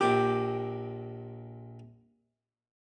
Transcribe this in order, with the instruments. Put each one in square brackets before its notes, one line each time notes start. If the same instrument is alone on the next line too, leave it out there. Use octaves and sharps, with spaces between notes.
[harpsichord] A#1 A#2 D6 [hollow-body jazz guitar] G4